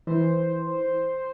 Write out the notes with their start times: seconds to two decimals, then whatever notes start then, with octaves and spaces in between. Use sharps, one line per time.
0.07 E3 C5